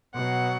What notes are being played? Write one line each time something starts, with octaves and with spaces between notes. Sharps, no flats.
B2 F#3 F#5